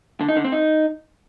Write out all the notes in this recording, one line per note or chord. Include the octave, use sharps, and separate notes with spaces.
D3
D#4
D3
C4
D#4